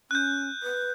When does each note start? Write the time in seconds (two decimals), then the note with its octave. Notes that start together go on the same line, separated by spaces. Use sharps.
0.11 C#4 F#6 G6
0.63 B4